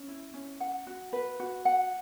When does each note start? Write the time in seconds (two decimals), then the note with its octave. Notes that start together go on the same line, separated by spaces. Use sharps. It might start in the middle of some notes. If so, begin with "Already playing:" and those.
Already playing: C#4
0.08 E4
0.34 C#4
0.60 F#5
0.87 F#4
1.13 B4
1.40 F#4
1.65 F#5